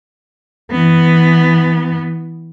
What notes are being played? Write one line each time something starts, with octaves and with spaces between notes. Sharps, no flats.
E3 B3